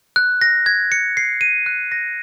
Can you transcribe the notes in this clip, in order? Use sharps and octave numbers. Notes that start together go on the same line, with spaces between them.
F#6
A#6
G#6
C#7
C7
D#7
F#6
A#6